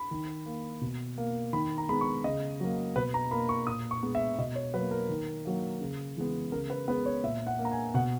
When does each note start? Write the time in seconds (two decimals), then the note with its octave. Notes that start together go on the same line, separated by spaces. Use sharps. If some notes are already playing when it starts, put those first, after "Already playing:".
Already playing: B5
0.11 D#3
0.46 A#3
0.81 B2
1.18 A#3
1.53 D#3 B5
1.78 A#5
1.89 G#3 B3 B5
2.01 C#6
2.24 C#3 D#5
2.60 F#3 A#3
2.96 B2 B4
3.14 A#5
3.31 A#3 B5
3.49 C#6
3.67 A#2 D#6
3.91 C#6
4.03 G#3 B3
4.15 E5
4.38 B2 D#5
4.55 C#5
4.74 F#3 A#3 B4
4.91 A#4
5.09 D#3
5.45 F#3 A#3
5.81 C#3
6.16 E3 G#3 B3
6.52 C#3 A#4
6.70 B4
6.88 G#3 B3 B4
7.06 C#5
7.23 A#2 E5
7.47 F#5
7.59 A#3
7.65 A#5
7.71 G#5
7.94 B2 F#5